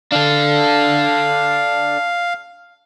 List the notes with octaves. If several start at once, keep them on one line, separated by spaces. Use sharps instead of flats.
D4 A4 F5